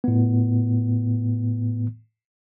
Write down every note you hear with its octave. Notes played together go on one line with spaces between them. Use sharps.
A2 B3